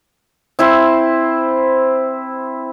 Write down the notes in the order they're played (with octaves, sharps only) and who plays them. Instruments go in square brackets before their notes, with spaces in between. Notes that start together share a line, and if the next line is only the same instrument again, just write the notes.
[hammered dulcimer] C4 E4 C5